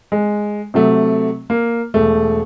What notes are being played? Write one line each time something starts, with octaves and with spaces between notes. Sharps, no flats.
G#3
C3 F#3 A3
A#3
E1 A3